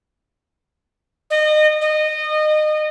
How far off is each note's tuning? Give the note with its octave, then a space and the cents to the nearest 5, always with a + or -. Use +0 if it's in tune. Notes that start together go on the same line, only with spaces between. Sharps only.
D#5 -30
D#5 -25